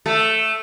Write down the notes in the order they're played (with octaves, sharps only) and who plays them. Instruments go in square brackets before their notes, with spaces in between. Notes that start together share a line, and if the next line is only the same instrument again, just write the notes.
[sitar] A3